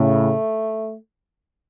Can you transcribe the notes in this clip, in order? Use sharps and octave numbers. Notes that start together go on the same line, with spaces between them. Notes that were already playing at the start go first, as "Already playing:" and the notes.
Already playing: A2 C#3 A3